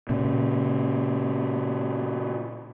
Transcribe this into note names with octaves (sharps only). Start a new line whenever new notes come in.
A#2 C#3